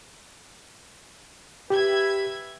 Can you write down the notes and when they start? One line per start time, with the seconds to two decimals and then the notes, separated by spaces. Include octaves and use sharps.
1.70 G4 B4 E5 G#6